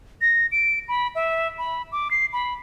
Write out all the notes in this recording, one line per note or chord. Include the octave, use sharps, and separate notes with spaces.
A#6
D7
B5
E5
B5
D6
C7
B5